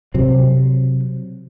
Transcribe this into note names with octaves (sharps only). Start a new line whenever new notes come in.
C3 F#3 C4